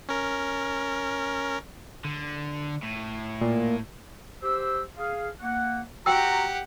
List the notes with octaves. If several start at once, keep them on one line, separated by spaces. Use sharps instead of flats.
C#4 A#4
D3
A2
A#2
G4 C5 E6
G#4 F5
A#3 F#5
F#4 G4 F#5 G5 A#5 E6